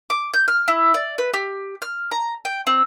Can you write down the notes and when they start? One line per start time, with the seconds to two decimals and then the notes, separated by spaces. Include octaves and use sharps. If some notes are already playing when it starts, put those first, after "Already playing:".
0.10 D6
0.34 G6
0.48 F6
0.68 E4
0.94 D5
1.18 B4
1.34 G4
1.82 F6
2.11 A#5
2.45 G5
2.67 C4